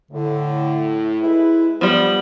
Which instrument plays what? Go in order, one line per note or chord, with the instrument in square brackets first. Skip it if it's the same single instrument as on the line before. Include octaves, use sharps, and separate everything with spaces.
[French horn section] A2 [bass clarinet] D3
[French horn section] G#3 G#4 B4 [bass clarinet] E4
[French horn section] G2 [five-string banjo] F3 G3 [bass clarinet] B3